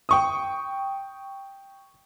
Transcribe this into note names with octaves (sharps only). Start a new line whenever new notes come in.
G5 C#6 D#6